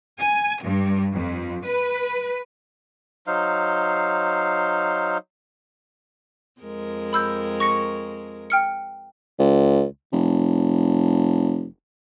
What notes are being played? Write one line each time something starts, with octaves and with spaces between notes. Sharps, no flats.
G#5
G2
F2
B4
F#3 D#4 C5 F5
F2 G#3 A#4
B5 E6 G6
C#6 A#6 C#7
G5 F6 C#7
C#2
F1